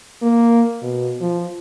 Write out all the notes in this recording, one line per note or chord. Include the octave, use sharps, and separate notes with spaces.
A#3
B2
F3